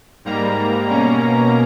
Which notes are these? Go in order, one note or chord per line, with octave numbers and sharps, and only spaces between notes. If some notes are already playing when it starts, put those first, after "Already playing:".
G#2 G3 A#3 A#5
B2 A#3 C#4 A#5